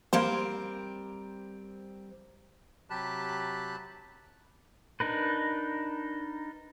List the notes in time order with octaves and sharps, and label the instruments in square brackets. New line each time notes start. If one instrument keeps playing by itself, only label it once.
[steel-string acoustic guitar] G3 C4 A#4 [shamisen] A#3 C5
[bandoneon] C3 F#3 G4 A5 B5 F#6
[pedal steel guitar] D4 D#4 A#4 B4